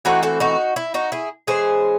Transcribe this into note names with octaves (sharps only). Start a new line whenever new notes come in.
E3 A3 C4 D#4 F#4
F#4 A4
D#4 F#4
E4
D#4 F#4
E4 G#4
E3 G#3 C#4 G#4 C5